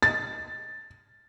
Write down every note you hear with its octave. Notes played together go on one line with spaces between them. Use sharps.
A6